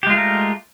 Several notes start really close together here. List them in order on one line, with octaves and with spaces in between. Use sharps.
G4 G#3 F4 A3 A#4